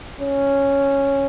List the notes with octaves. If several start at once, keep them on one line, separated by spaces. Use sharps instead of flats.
C#4